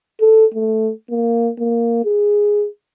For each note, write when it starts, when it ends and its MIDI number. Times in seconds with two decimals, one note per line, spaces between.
0.20 0.45 69
0.54 0.91 57
1.10 1.50 58
1.59 2.01 58
2.05 2.67 68